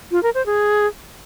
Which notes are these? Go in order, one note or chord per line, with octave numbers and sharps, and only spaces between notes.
F4
A#4
C5
G#4